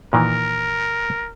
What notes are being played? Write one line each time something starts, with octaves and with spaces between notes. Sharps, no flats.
A#2 D#3 E3 A#4